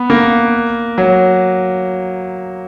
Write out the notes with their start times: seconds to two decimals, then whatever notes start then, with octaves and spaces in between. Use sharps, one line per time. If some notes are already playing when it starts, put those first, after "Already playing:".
Already playing: B3
0.10 A#3
0.98 F#3